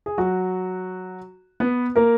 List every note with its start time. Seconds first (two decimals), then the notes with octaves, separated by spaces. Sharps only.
0.06 G#4
0.18 F#3 F#4
1.60 B3 B4
1.96 A#3 A#4